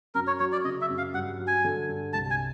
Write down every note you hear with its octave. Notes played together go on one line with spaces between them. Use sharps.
F#2 A#4
C#5
F#3 C#5
D5
C#3 D#5
E5
F#2
F5
G2 F#5
F#3
G#5
D3
G2
C2 A5
G#5